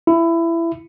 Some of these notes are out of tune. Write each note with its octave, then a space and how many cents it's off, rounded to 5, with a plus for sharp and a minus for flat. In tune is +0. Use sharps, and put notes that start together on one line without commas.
E4 +20